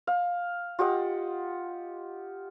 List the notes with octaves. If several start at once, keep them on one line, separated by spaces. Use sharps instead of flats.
F5
F4 G4 D#5 F#5